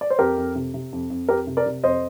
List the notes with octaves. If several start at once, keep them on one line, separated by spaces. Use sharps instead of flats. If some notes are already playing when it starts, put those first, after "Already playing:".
D5
C5
F2 G4 A#4
F2
C3
C3
F2
F2
F2 G4 A#4
C3
A#4 D5
C3
F2 C5 D#5